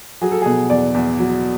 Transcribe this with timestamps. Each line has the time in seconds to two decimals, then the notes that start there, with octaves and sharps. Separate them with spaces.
0.21 F#3 G#4
0.32 A4
0.42 B2 G#4
0.70 E2 D5
0.94 E2
1.19 F#3